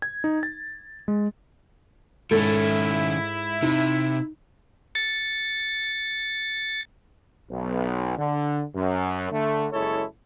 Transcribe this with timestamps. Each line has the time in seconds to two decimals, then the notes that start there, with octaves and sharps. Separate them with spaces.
0.02 G#6
0.24 D#4
0.43 A6
1.08 G#3
2.31 G#2 D#3 C#4 E4 A4
3.62 C3 D#4
4.95 A6 C#7
7.50 B1
8.18 D3
8.75 F#2
9.32 D3 A3
9.72 F#1 G#3 E4 A4 C#5